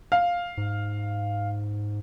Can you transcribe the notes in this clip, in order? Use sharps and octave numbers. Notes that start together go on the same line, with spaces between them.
F5
G#2